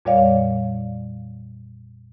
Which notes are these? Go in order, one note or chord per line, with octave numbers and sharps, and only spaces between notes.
F2 A#2 G3 C#5 D5 F5